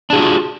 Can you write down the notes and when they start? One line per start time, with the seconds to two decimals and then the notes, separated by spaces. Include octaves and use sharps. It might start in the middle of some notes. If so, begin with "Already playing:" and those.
0.10 D4
0.13 G#4
0.15 F#4
0.18 F4